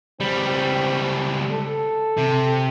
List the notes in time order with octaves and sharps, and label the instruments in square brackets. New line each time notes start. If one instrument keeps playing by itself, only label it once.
[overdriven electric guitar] C#2 G3 [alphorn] C4
[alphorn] A4
[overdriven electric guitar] C3